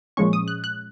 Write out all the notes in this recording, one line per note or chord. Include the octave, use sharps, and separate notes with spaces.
A#2 F3 G#3 C#4 C#6
D#6
F#6
F#6